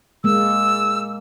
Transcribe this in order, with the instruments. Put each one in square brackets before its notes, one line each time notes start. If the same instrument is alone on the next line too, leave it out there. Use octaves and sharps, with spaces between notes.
[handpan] G#3 A#3 [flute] E6